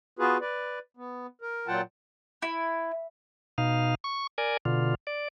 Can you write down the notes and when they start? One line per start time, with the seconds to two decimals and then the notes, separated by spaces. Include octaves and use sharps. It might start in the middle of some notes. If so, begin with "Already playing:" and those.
0.19 B3 F4 F#4 G#4 B4
0.41 B4 D5
0.97 B3
1.42 A#4
1.68 A#2 F#3 F4 F#5 G5 A5
2.42 E4
3.58 B2 D#4 F5
4.04 C#6
4.38 A#4 D5 G#5
4.65 B2 D3 F4
5.07 D5